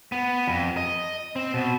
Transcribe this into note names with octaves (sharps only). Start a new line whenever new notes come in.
B3
F2
D#5
C4
B2